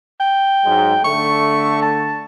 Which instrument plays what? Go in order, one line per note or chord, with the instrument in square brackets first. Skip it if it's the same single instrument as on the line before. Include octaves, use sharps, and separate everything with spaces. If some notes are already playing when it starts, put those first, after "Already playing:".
[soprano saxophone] G5
[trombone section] G#2 F#3 G#3
[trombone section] D3 A3 [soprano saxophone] C#6
[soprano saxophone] A5